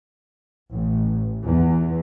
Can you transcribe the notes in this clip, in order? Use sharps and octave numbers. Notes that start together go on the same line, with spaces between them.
A1
E2